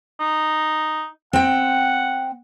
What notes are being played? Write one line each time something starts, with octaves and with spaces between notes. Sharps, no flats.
D#4
C4 F#5 G5